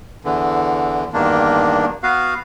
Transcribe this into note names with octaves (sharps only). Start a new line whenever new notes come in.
E2 D3 E3
E2 G2 D#3 A#3 D4
B3 F#4 B4 F5